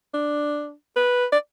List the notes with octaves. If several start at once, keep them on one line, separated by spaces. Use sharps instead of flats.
D4
B4
D5